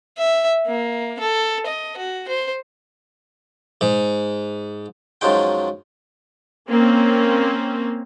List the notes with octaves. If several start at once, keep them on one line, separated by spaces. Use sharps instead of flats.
E5
A#3
A4
D#5
F#4
C5
G#2
F#2 D#3 F3 F#3 G#3 G5
A#3 C4 C#4